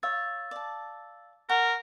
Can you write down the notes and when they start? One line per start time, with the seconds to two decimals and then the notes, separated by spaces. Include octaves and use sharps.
0.03 C#5 F5 E6 A6
0.51 D5 A5
1.49 A#4 F#5 C#6